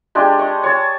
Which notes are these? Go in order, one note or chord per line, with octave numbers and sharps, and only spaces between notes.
G#3 D4 G4
D#5 C#6
C#5 A5